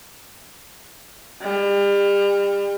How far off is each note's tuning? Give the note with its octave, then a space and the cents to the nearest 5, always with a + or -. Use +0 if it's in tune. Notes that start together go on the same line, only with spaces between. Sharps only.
G3 +35